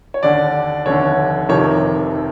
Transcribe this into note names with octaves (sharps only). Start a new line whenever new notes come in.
C#5
D#2 D3 D5
F1 D#2 D3 C#5
F1 F2 C3 D#3 C#5